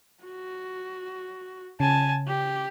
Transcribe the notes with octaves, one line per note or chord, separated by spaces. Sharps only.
F#4
C#3 G#5 A5
G4